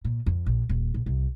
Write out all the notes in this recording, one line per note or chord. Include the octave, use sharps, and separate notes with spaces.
A#2
F2
A#1
D#1
A#1
C2